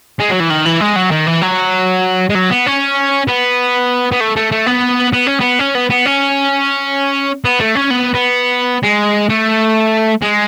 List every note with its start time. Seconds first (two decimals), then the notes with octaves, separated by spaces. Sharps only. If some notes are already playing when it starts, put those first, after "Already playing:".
0.19 G#3
0.30 F#3
0.40 E3
0.50 D#3
0.65 E3
0.81 G#3
0.96 F#3
1.11 D#3
1.27 E3
1.42 F#3
2.29 G#3
2.35 F#3
2.50 B3
2.66 C#4
3.28 B3
4.12 B3
4.20 A3
4.36 A3
4.52 A3
4.66 B3
5.13 B3
5.27 C#4
5.40 B3
5.59 C#4
5.75 B3
5.90 B3
6.06 C#4
7.45 B3
7.60 A3
7.75 C#4
7.90 B3
8.14 B3
8.83 G#3
9.29 A3
10.22 G#3